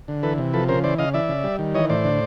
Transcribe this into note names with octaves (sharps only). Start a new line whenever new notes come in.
D3
E3 A4 B4
C3
F3 A4 B4
C#3 A#4 C5
E3 C5 D5
C#3 D#5 F5
E3 D5 E5
C#3
G3
D#3
E3 C#5 D#5
A2 C5 D5
D3